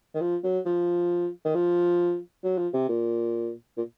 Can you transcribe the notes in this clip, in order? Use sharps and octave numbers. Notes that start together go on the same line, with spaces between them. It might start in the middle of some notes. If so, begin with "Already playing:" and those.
D#3
F3
F#3
F3
D#3
F3
F#3
F3
C3
A#2
A#2